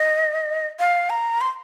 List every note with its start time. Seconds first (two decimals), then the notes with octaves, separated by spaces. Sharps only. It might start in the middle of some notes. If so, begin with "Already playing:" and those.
Already playing: D#5
0.80 F5
1.10 A#5
1.41 C6